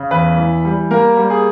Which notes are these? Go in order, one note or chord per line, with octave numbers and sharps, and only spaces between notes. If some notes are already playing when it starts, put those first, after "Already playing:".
Already playing: C#3
E2 B4
E3
G3
A#3 A#4
G3
G#4